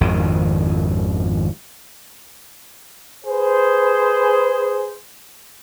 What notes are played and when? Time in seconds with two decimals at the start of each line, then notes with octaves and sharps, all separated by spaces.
0.01 G#1 F2 D#3
3.26 G#4 B4 C5